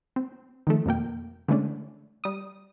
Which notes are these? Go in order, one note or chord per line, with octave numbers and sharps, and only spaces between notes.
C4
D#3 F3 A3
F2 B2 A#3 G5
D3 E3 G#3 A3 C#4 D4
G3 D#6